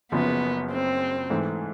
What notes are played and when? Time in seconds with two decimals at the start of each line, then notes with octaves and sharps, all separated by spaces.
0.12 F#1 F#2 C#3 F3 B3
0.72 C4
1.30 G#2 E3 A3